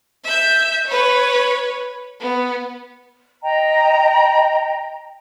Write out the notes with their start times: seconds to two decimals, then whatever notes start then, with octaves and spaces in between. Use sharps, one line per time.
0.24 E5 G6
0.87 B4 C#5
2.20 B3
3.43 D#5 G5 A#5